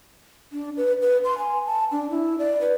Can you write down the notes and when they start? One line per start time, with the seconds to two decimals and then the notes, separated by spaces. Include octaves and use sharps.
0.53 D4
0.77 B4
1.02 B4
1.24 C6
1.38 G#5
1.66 A5
1.92 D4
2.10 E4
2.38 D5
2.61 B4